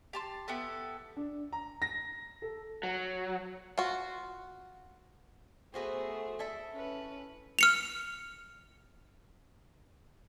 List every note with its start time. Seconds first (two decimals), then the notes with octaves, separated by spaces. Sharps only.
0.13 G4 A5 C6
0.48 B3 E4 G4 A4
1.17 D4
1.53 A#5
1.82 A#6
2.42 A4
2.83 F#3
3.78 F4 F#4
5.74 A3 B3 F#4 G#4 C5
6.39 E4 A4 E5
6.73 C#4 B4
7.59 F6 C#7 F7